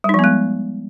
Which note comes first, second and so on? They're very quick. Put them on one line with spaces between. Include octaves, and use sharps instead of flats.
G3 D#4 F3 B3 G#3